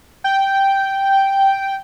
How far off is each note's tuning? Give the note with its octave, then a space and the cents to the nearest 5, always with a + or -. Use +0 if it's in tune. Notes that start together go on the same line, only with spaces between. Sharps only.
G5 -5